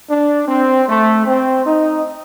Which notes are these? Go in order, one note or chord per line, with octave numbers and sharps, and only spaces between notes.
D4
C4
A3
C4
D#4